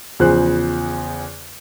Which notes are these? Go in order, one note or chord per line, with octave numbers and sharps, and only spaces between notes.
E2 C#3 F3 G#4 C5 F#6